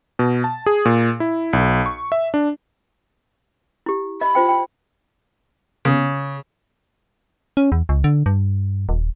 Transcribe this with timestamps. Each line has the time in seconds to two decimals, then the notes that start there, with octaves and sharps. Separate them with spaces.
0.19 B2
0.44 A5
0.66 G#4
0.85 A#2
1.20 E4
1.53 B1
1.86 C#6
2.12 E5
2.34 D4
3.86 E4 G4
4.21 D#5 B5
4.35 F4 C5 G5
4.49 G5
5.85 C#3
7.57 C#4
7.72 E2
7.89 C#2
8.04 D3
8.26 G2
8.89 D#1